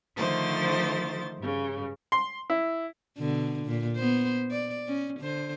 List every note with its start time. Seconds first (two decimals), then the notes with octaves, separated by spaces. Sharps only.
0.17 D3 D#3 F3 A3 C5 A6
1.39 G2 C#3
2.12 C6
2.50 E4
3.18 B2 D3
3.66 A#2
3.96 B3 C5
4.51 D5
4.88 C#4
5.20 D3 C5